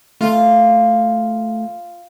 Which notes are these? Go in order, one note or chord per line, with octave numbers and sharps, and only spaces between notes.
A3 F4